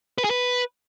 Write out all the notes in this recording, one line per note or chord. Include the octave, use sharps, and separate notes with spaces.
B4
G#4
B4